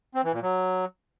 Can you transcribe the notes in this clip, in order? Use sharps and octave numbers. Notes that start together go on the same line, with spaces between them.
C4
E3
A#2
F#3